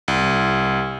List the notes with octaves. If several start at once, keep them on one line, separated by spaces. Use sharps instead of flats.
C2